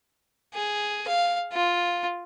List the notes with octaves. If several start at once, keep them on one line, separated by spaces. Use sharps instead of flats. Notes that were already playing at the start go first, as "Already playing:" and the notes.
G#4
F5
F4